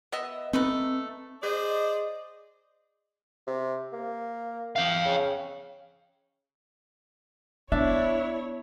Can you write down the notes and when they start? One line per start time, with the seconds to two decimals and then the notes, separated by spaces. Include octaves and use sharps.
0.12 B3 D#5 E5
0.53 A3 C4 D#4 B4
1.43 G#4 C5 D5 D#5
3.47 C3
3.93 A#3
4.76 F5 G5
5.05 C#3
7.72 B3 D4 E4 C#5 E5